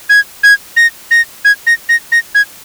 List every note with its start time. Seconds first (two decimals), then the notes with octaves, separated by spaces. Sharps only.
0.09 G#6
0.43 G#6
0.77 A#6
1.11 A#6
1.45 G#6
1.67 A#6
1.89 A#6
2.12 A#6
2.35 G#6